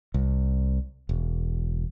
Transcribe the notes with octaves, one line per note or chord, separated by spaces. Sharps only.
C2
E1